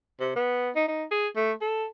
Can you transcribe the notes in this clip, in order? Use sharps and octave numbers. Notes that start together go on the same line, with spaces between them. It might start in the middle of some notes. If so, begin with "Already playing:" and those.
C3
B3
D#4
D#4
G#4
A3
A4